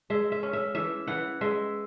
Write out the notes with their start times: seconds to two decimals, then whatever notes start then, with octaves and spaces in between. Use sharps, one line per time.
0.10 G#3 E5
0.32 E5
0.43 C#4
0.53 E5
0.75 E3 E5
1.07 E3 F#5
1.41 G#3 E5